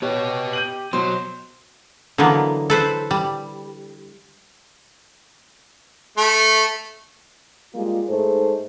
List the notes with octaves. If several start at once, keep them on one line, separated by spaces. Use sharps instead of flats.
B3 G4 B4 C#5 D#5
G6 D#7 F#7
B2 F#3 C5
D3 E3 F#3 A#3 B3
A4 B4 C5
G3
A3
G3 G#3 A#3 F4
G#2 A3 D#4 G#4 A4 C5